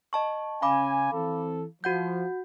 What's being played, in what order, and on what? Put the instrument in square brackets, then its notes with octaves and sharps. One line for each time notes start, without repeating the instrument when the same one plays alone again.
[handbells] D#5 A5 C#6
[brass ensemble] C#3 C#4 G#5 [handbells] F5 B5 D6
[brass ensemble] E3 C4 A4
[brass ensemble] F3 [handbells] F#4 F#5 G6